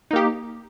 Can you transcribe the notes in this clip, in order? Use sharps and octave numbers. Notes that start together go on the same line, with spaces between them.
A#3 D#4 G4